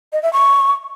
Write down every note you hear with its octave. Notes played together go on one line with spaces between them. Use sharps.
D#5
E5
C#6